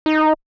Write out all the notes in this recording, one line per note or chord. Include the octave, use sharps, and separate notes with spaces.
D#4